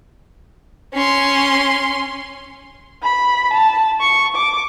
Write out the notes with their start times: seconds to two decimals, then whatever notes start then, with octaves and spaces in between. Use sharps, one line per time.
0.94 C#4 C6
3.03 B5
3.53 A5
4.00 C#6
4.36 D6